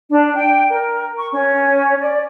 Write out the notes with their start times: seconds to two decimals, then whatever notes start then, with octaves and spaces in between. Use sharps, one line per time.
0.09 D4
0.35 G5
0.69 A#4
1.16 C#6
1.31 C#4
1.99 D5